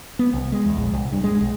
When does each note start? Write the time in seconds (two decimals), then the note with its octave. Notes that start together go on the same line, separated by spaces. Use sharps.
0.19 B3
0.34 C2
0.52 G#3
0.65 E2
0.77 A#1
0.93 C2
1.12 G2
1.24 G#3
1.41 B1